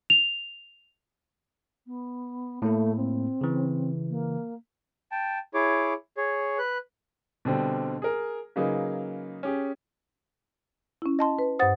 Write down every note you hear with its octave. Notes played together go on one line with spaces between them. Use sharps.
F7
B3
A2 A3 A#3 E4
C4
C#3 E3
A#3
G5 A5
E4 G#4 C#5 D6
G#4 C#5
B4 F#6
B2 D3 G3 C4
G#4 A#4
C#3 F#3 A#3 D#4 G#4 B4
C#4 G4 G#4
C#4 E4
D#5 A5 C6
B4
G2 C5 F#5 D#6 A6